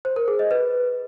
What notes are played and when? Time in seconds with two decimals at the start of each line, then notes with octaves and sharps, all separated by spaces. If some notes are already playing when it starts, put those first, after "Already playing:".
0.05 C5
0.16 A#4
0.28 G#4
0.39 D#5
0.51 B4